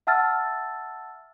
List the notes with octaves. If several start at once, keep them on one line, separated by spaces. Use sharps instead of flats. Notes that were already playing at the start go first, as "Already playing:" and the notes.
E5 F#5 A5 E6 F6 A6